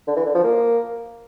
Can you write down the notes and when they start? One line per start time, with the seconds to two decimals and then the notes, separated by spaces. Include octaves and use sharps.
0.07 D3
0.16 E3
0.25 D3
0.35 F3
0.44 A#3